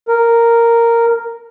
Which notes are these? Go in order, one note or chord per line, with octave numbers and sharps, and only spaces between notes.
A#4